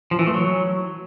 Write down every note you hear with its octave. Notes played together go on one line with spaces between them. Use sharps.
F3
E3
A3
F#3